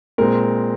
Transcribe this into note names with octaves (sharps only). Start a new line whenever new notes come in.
A#2 G#3 C4 A#4